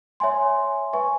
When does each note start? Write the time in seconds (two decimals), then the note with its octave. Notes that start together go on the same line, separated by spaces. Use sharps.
0.20 C#5 E5 G#5 C6
0.93 B4 E5 G#5 C#6